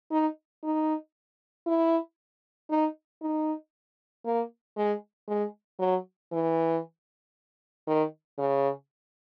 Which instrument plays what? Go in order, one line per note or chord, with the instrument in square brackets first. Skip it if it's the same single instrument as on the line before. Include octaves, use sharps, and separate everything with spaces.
[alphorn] D#4
D#4
E4
D#4
D#4
A#3
G#3
G#3
F#3
E3
D#3
C#3